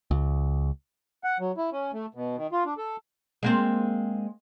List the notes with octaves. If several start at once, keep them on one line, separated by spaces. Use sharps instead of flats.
C#2
F#5
F#3
E4
C#4
A3
B2
D#3
F4
D4
A4
G#3 A#3 C4